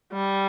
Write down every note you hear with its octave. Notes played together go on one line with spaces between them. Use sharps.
G3